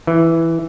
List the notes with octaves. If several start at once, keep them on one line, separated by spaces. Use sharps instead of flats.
E3